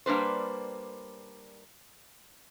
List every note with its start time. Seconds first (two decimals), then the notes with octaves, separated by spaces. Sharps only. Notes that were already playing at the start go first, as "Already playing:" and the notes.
0.06 G3 A#3 D4 B4 C5